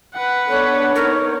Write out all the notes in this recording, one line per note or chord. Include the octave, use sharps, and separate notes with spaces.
B4 F#5
B3 D4 A4 C#5
B3 D#4 A#4